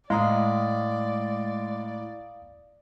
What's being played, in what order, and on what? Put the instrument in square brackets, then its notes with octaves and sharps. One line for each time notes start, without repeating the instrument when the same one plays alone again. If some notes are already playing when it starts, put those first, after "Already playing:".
[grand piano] A2 A#5 [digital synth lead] G#3 [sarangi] D5 [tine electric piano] F5 D#6